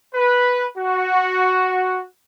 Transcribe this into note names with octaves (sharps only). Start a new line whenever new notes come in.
B4
F#4